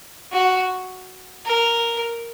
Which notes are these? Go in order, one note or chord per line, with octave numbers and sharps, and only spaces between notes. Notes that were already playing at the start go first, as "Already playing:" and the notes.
F#4
A#4